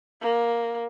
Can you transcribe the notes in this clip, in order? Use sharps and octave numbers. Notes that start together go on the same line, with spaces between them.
A#3